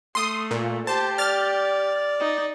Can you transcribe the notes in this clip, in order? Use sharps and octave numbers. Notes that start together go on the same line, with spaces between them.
A3 C6 D#6
A#2
G4 C5 A5
D5 F6 A6
D#4